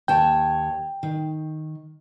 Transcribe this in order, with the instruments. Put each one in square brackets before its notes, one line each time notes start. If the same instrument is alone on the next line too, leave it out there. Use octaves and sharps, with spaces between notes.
[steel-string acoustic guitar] D#2 C#5 A5 [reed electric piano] G5
[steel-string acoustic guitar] D#3